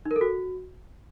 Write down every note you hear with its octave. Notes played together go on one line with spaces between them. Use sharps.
D#4
A#4
A4
F#4